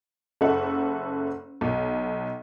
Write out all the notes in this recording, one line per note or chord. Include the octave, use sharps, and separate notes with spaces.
F#1 A4 E5 F#5
B1